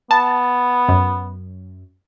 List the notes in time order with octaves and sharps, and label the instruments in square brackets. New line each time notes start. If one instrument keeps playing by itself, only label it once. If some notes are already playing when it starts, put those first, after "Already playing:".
[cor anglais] B3 [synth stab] A5
[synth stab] F#2